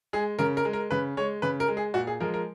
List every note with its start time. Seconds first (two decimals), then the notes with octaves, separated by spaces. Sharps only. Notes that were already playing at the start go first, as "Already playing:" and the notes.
0.13 G#3 G#4
0.39 C#3 A#4
0.57 A#4
0.65 G#3
0.73 A#4
0.91 C#3 B4
1.17 G#3 C#5
1.42 C#3 B4
1.60 A#4
1.68 G#3
1.77 G#4
1.94 A#2 F#4
2.07 G#4
2.20 F3 G#3 A#4
2.34 A#4